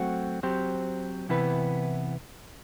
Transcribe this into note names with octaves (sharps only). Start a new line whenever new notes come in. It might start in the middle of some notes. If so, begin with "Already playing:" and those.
Already playing: F#3 A3 C4 F#4
F#3 C4 G4 C5
C3 E3 B3 E4 B4